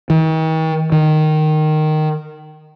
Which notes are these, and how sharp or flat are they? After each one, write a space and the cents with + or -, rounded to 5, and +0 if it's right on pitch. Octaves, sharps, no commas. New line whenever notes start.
D#3 +45
D#3 -10